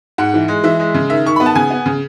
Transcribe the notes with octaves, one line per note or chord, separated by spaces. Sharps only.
G#2 F#5
E3
G#3
E3 E5
G#3
C#3
D#3 E5
D#3 C#6
B3 B5
A5
C#3 G#5
B3
C#3